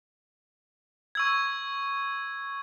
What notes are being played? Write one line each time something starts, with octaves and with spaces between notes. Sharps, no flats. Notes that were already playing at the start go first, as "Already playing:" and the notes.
C#6 E6 G#6